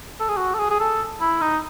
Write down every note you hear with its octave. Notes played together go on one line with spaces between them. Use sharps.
A4
G#4
F#4
A4
G#4
G#4
A4
E4
D#4